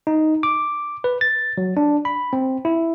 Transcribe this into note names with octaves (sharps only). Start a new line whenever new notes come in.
D#4
D6
B4
A6
F#3
D4
B5
C4
E4